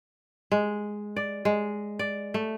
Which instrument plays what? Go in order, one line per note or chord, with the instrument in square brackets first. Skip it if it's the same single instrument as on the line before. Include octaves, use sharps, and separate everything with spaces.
[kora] G#3
D5
G#3
D5
A3